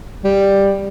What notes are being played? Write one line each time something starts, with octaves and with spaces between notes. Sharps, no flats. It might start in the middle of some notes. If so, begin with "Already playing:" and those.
G3